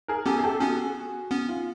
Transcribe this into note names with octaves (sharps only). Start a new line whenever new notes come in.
G#4 A#4
B3 C#4 G4 A4
G#4
G4 A4
B3 C#4 F#4 G#4
B3 C#4
F4